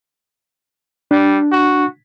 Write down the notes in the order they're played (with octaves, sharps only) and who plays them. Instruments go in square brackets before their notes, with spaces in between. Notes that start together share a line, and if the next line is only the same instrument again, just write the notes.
[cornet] G3 [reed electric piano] D4
[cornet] F#4